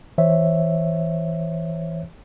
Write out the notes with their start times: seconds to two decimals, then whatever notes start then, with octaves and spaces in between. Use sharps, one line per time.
0.18 E3 C5 C#5 E5